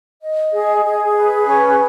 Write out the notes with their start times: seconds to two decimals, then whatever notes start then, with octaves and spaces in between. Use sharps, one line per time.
0.21 D#5
0.52 G#4
0.84 G#4
1.14 B4
1.46 C#4